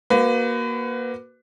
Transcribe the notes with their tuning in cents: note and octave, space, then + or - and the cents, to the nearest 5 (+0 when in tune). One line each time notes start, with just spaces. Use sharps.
A#3 +20 F#4 +5 B4 +30